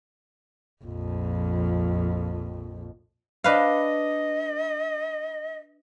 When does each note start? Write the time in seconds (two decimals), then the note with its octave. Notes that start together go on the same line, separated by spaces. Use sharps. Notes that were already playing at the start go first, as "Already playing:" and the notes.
0.84 A#1 F2
3.44 D4 B4 D#5 F5